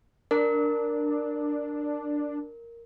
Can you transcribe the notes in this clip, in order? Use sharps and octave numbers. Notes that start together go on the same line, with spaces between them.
D4 A#4